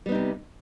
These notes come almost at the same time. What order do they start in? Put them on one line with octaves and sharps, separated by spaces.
G3 B3 D#4 C3